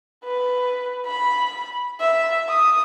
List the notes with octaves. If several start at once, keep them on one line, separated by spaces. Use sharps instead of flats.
B4
B5
E5
D#6